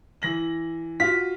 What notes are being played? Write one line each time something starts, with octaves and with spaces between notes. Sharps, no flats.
E3 A#6 F#7
F4 F#4 B6